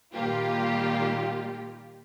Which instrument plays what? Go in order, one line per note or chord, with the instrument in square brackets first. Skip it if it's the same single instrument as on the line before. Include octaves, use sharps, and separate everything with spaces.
[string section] A#2 D#3 G3 A#3 F4 G4